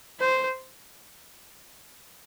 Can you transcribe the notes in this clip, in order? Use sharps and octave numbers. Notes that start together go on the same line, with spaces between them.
C5